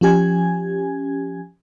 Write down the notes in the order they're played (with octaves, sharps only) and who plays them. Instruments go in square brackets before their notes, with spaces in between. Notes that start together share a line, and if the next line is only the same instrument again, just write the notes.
[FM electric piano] F3 C#4 G4 G#5 G#6